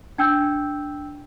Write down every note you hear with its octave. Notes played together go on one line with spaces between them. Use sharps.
D4 G5 E6 G6